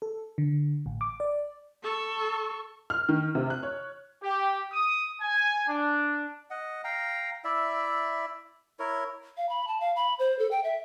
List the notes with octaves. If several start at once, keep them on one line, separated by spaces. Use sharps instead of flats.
A4
D3
A1
D6
D5
A4 C#6
F6
D#3
C3
F#6
C#5
G4
D#6
G#5
D4
D#5 F#5
F5 G5 A#5
E4 D5 E5
E4 A#4 C#5
F5
B5
A5
F5
B5
C5
A4
G5
E5